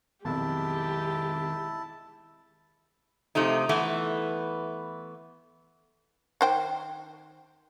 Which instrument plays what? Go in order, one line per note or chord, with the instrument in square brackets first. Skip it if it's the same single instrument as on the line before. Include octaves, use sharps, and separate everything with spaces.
[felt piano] B1 F2 [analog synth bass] D#3 [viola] G#3 G4 [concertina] E4 A5
[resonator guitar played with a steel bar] C3 F3 A3 D#4
E3 A3 B3 E4
[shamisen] D#3 C5 G5